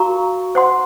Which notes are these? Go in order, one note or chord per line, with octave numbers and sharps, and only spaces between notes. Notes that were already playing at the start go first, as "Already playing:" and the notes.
Already playing: F#4 A#4 F5 A#5 C#6
C5 F#5 C6